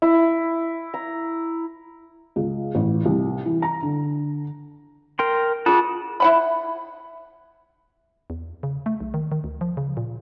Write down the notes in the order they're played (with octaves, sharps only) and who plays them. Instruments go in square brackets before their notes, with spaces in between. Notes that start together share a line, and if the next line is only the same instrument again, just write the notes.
[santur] E4
A#5
[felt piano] C#2
A1
C2
E3
A#5
D3
[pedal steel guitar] A#4 G5 C6
[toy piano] F4 G#4 [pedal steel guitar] F#5 A5 D#6
[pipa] E4 F#5 B5
[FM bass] E2
C#3
A3
B1
D#3
D#3
D2
F3
C#3
A#2